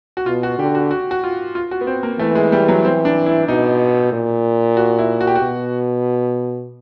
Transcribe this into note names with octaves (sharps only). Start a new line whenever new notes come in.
F#4
B2 F4
F#4
D3 G4
F#4
F#4
F#4
F4
F4
F#4
B3
C4
A#3
E3 A3
G#3
G3
F#3
C4
D4
E4
B2 D#4
A#2
F#4
E4
F#4
G4
F#4
B2